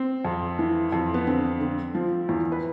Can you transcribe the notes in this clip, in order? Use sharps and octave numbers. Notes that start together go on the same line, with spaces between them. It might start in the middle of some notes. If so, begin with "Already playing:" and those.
Already playing: C4
F2
E3
F2
B3
D3 C4
D3
F3
E2
B4